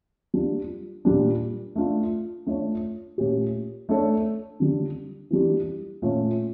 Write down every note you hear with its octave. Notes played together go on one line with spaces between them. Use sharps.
G3 D4 F4
A#2 G3 D4
A3 D4 F4
A3 D4 F4 C#5
A#2 A3 C#4 G4
A3 D4 A4 C#5
D3 G3 D4
E3 G3 D4 G4
A#2 A3 C#4 F4